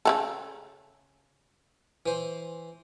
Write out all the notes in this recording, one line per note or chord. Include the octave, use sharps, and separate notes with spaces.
C#3 F#3 A4
E3 C5